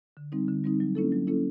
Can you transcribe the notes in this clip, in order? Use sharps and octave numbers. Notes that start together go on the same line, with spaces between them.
D3
G3 C4 D#4
D3
G3 C4 D#4
F#3
A#3 C#4 E4 A4
F#3
A#3 C#4 E4 A4